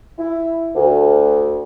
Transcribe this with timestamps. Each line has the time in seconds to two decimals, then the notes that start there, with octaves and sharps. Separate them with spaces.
0.18 E4
0.75 D2